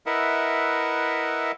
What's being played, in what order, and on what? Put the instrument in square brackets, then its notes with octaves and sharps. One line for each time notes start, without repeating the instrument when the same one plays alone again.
[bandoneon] E4 A#4 B4 D#5 E5 F#5